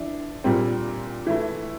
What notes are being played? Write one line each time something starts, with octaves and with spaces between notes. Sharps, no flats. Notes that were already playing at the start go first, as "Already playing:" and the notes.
Already playing: E3 D4
A#2 G3 C4
E3 A3 E4